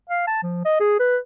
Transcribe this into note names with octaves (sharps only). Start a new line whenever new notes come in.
F5
A5
F3
D#5
G#4
B4